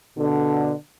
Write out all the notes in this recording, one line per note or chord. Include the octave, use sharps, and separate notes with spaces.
B2 D3